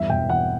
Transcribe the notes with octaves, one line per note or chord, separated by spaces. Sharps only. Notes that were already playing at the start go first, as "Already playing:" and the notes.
Already playing: E2 G2 E5
E1 G5
E3 F#5